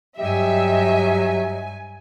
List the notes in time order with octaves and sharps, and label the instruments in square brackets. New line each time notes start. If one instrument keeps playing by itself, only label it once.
[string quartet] G2 G#5 [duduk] F#3 [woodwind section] G4 D#5 [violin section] E5